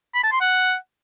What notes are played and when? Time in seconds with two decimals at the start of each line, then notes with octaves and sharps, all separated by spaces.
0.15 B5
0.23 A5
0.32 C6
0.41 F#5